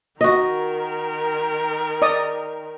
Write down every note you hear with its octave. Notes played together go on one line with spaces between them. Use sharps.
D#3 F#4 A#4 D#5
D5 D#5 D#6